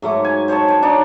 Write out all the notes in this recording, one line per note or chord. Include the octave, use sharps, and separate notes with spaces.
G#2 F#3 A3 D6
G#5
C5 C#5 D#5 A5
C#5
D4 D#4 C#5 D5